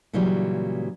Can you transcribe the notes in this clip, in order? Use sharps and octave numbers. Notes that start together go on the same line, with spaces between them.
A#2 C#3 E3 F#3 G3